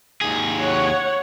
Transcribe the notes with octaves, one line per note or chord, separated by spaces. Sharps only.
D#2 G#4
C#5 F#5